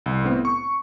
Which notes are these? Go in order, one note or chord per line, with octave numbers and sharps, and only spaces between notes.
C2
A2 B3 C4
C#6